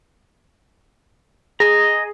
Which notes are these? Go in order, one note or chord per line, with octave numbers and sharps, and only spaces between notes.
G#4 D#5 A#5